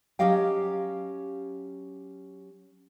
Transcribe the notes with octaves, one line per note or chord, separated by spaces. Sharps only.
F#3 C#4 G4 D#5 F5 G5